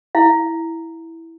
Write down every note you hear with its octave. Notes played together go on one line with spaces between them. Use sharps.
E4 F5